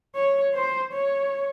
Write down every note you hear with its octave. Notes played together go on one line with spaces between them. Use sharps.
C#5
C5
C#5